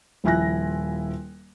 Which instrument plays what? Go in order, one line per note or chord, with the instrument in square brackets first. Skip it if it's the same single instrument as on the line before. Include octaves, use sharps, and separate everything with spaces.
[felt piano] D#1 F3 E4 G#5 F#6 A#6